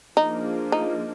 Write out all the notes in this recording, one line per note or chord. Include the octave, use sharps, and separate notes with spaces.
F3 A#3 D4 D#4 F4 G#4
D#4